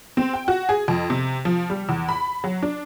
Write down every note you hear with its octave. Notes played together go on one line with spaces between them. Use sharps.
C4
G5
F#4
G#4
F2
C3
F3
G3
E2
B5
F#3
D4